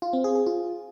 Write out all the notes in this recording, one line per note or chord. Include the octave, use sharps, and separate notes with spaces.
F4
C4
G#4
G#4
F4